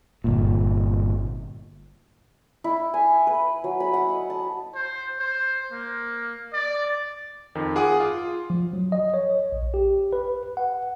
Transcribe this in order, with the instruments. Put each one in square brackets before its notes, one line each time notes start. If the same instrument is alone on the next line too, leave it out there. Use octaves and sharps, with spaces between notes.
[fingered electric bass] G1 A#2
[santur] E4
G#5
B4
F#3
B5
F#5
D#5
A5
[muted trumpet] C5
C5
A#3
D5
[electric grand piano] F2 D#3
F4 G#4 F#5 D6 D#6
F4
[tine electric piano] F3
F#3
D#5
C#5
A#1
G4
B4
F#5